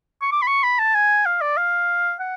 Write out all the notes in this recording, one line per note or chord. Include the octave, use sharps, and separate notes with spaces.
C#6
D6
B5
C#6
B5
A5
G#5
F5
D5
F5
F#5